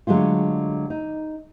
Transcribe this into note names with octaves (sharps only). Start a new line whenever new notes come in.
D3 F#3 G#3 A3 F4
D#4